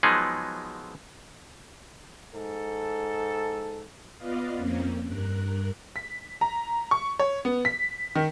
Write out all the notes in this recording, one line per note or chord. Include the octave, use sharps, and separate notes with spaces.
F3 F#3 G#3 B3 D#4 G#4
G#2 A4
B3 F4 B4 D5 D#5 F5
F2 A#3 C4 C#4
G2 A#4 F#6
B6
A#5
C#6
C#5
B3
B6
D#3